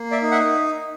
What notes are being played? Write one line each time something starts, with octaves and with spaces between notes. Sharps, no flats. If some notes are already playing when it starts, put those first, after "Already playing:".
Already playing: A#3
D5 E5
D#4
E5 F#5